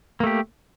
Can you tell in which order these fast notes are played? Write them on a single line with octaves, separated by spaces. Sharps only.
A#3 A3 G4